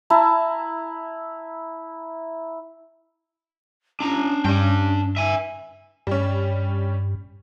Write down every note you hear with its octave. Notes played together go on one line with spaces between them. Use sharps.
E4 A5 A#5
C#4 D4 A#5
G2 D4 G5
E5 G#5
G2 G3 C#4